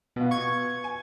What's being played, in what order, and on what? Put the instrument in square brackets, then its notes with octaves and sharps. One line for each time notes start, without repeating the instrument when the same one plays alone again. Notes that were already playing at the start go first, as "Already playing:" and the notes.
[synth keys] B2 [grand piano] B3 F4
[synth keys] C#6 G#6
[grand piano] G#5